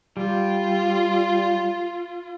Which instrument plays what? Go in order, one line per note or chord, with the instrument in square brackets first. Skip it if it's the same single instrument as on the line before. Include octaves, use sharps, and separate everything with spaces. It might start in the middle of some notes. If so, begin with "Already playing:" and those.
[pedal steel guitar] G3 [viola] F4